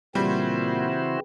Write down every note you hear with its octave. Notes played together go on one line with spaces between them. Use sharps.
A#2 C#3 E3 G3 C4 E4 F#4 C5